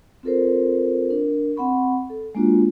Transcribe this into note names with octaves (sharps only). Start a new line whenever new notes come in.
C4 F4 A4 A#4 C5
D4 A#4
C4 F#5 B5 C#6
A4
G#3 A#3 D4 F4 F#4